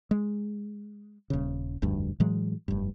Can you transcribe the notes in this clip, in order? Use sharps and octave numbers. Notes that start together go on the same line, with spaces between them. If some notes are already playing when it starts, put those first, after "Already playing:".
G#3
D#1 C#3
F1 D2 G2
A2 E3 F#3 G#3
F1 G2